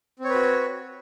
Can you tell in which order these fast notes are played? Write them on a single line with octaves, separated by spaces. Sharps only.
C4 C#5 B4 F#4